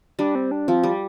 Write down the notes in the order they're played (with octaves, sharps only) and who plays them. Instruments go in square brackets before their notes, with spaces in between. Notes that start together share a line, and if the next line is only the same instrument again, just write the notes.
[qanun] G3 [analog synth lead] D4
[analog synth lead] C4
D4
[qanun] F3 [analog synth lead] C4
[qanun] G3